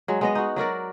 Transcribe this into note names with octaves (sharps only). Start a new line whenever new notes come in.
F#3 G#3
G#3 B3 D#5
D#4 F#4
F#3 F#4 A#4 D5